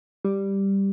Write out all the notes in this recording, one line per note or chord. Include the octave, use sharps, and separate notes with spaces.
G3